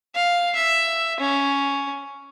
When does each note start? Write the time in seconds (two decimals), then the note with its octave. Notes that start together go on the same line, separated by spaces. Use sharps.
0.15 F5
0.56 E5
1.20 C#4